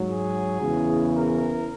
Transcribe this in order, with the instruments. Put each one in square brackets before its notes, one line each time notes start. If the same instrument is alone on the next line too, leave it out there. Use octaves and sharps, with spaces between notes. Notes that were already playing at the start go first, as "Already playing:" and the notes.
Already playing: [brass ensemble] G#2 F#3
G#4
E2 C#3 E3
A#4